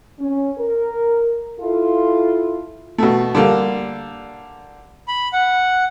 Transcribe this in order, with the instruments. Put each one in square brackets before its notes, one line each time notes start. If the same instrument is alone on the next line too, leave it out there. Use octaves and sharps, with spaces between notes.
[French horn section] C#4
A#4
E4 F4 A4
[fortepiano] B2 A3
D3 G3 A#3
[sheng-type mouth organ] B5
F#5